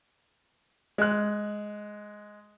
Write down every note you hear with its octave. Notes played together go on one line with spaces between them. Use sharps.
G#3 F#6